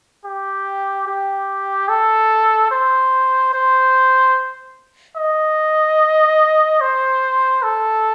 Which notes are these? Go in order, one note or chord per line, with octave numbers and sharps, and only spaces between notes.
G4
G4
A4
C5
C5
D#5
C5
A4